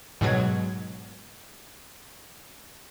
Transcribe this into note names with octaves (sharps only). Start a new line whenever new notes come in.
G#2 B2 F#3 G#6